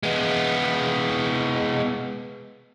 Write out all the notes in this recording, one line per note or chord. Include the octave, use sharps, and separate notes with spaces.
G#3 B3